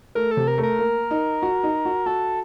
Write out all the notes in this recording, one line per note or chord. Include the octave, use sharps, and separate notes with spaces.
A3 A#4
A4
C3
A#4
A3
A#4
A#3
D#4
F#4
D#4
F#4
F#4 A4